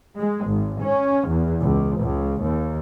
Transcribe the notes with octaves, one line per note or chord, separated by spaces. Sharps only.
G#3
G#1
C#4
E2
C#2
C#2
D#2